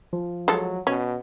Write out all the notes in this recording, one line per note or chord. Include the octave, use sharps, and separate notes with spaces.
F3
F#3 G#3 A4
B2 C#4